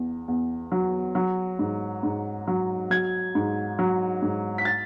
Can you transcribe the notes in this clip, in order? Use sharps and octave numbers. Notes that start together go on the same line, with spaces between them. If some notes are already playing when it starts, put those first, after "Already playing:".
Already playing: E2
E2
F#3
F#3
G#2
G#2
F#3
F#3 G#6
G#2
F#3
G#2
B6
A6